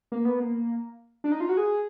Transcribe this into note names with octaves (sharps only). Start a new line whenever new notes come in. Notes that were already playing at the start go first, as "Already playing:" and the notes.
A#3
B3
A#3
D4
D#4
F4
F#4
G#4